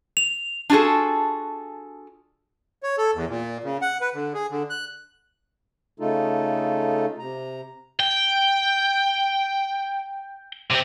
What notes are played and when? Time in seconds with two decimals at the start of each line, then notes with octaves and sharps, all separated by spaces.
0.17 F7
0.70 D4 F4 F#4 G#4 A4
2.83 C#5
2.98 A4
3.14 E2
3.28 A#2
3.64 C#3
3.82 F#5
4.01 B4
4.14 D3
4.34 G#4
4.50 D3
4.70 F#6
6.00 C#3 A3 D#4 F4 A4
7.19 C3 A#5
8.00 G5
10.70 C3 C4